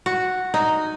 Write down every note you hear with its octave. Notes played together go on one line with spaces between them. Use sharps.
F#4
D#4